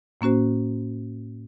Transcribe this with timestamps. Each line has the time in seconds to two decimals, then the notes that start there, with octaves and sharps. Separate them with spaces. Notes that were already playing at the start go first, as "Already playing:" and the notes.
0.21 A2 A#3 C#4 F#4 C5